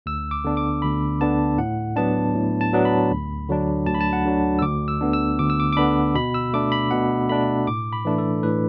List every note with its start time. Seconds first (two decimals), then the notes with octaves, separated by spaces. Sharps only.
0.06 D2 E6
0.31 D6
0.44 D3 B3 D4
0.57 D6
0.82 D2 B5
1.21 D3 B3 D4 A5
1.58 A2 F#5
1.96 F#3 B3 D4 A5
2.35 A2
2.61 A5
2.73 F#3 B3 D4
2.85 B5
3.11 D2
3.49 D3 F#3 D4
3.86 D2 A5
3.95 B5
4.01 A5
4.13 F#5
4.25 D3 F#3 D4
4.59 E6
4.62 D2 D6
4.88 E6
5.01 D3 B3 D4
5.13 E6
5.39 D2 D6
5.50 E6
5.60 D6
5.73 D6
5.77 D3 B3 D4 B5
6.15 B2 B5
6.34 E6
6.53 A3 D4 D6
6.72 B5
6.91 B2 F#5
7.29 A3 D4 B5
7.67 A2 D6
7.93 B5
8.05 E3 A3 D4
8.18 A4
8.43 A2 B4